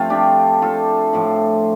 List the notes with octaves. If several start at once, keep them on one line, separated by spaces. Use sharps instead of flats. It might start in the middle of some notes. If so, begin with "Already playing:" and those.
Already playing: G2 F3 A3 C4 F4
D4 G4
F4 A4
A2 F3